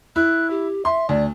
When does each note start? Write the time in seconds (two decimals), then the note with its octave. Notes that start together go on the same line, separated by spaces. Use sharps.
0.16 E4 F#6
0.50 G4
0.85 E5 C6
1.09 D2 D5